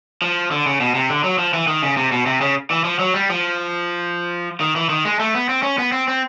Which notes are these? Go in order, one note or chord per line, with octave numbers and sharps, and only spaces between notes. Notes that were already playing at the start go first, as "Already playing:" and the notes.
F3
D3
C#3
B2
C3
D3
F#3
F3
E3
D#3
C#3
C3
B2
C3
C#3
E3
F3
F#3
G3
F3
D#3
E3
D#3
G#3
A3
B3
C4
C#4
B3
C4
C4